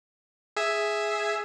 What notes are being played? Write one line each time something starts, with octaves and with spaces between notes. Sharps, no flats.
G#4 E5